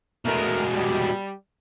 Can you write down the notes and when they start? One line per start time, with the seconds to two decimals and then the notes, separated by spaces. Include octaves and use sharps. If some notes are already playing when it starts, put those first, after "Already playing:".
0.25 B2 G#3 A3 A#4
0.72 G3